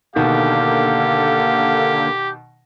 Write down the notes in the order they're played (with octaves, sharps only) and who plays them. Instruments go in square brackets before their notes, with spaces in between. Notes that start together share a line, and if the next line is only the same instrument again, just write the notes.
[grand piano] B2 D#3 [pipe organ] D3 A#3 [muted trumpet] G4 [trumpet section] A4 F5 F#5